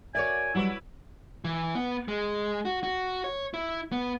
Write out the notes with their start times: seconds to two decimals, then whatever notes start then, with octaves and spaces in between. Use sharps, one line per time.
0.15 F#4 A#4 C#5 D5 E5 G#5
0.54 F#3 G3 D4 E4 F#4 B4
1.45 E3
1.75 B3
2.08 G#3
2.65 F#4
2.83 F#4
3.24 C#5
3.54 E4
3.92 B3